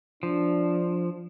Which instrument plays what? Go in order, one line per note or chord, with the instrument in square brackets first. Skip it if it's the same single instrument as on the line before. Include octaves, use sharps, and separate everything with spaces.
[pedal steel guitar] F3 [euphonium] D4